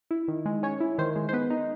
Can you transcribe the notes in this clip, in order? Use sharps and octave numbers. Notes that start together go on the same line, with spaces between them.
E4
D#3
G#3
C#4 C#5
E4
D#3 C5
G#3
C5
B3 B4
D#4